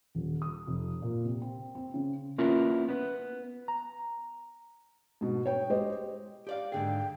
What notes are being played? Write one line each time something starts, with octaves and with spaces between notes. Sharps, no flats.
D#1
D#6
F1
A#2
C3
C4
C4
C#3
A#3 B3 C#4 E4 F4 A#4
B3 B4
A#5
G#2 B2
C#5 G5
G#3 G4 C5 D#5
G4 D5 F5
G#2 D3 G#4 G5